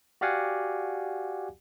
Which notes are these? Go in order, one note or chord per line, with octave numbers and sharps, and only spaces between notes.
F#4 G4 D5 F5 F#5 G#5